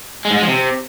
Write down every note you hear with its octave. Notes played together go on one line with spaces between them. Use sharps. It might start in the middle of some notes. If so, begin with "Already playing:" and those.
G#3
G#2
G#3
F3
C3